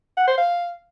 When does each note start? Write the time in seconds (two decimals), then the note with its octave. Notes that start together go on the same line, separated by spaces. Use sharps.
0.17 F#5
0.27 C5
0.38 F5